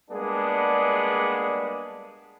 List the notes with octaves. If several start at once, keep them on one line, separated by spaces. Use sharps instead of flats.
G3 G#3 A#3 B3 D4 G#4